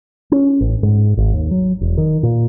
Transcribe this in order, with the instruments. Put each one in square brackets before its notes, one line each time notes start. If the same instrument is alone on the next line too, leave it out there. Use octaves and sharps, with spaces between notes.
[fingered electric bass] C#4
A1
G#2
G#1
D#2
F#3
E1
D#3
A#2